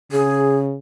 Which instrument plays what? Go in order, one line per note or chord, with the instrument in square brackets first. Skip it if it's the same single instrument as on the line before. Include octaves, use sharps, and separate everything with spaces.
[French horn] C#3 [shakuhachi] G#4